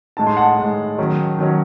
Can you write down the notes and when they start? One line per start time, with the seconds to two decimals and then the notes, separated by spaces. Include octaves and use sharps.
0.17 A2 G#3 D#4 A5
0.27 C6
0.37 F#5 A5
0.58 A2 G#3 D#4
0.98 D#3 F#3 C#4
1.39 D#3 F#3 C#4